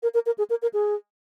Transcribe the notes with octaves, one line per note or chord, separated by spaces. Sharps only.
A#4
A#4
A#4
G#4
A#4
A#4
G#4